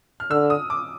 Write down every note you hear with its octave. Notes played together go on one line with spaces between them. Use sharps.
F6
D3 E6
D#6
D6